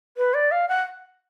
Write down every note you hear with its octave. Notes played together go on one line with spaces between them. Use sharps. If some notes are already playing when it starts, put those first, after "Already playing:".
B4
D5
F5
F#5